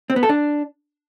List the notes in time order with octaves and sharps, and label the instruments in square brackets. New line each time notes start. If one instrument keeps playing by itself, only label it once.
[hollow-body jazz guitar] C4
B3
A4
D4